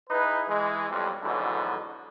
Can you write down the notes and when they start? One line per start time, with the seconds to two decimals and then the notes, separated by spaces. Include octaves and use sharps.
0.10 D#4 E4 G#4 B4
0.48 E3 G#3
0.89 B1 F2 G3
1.22 F2 G#2 B2 D3 E3 F#3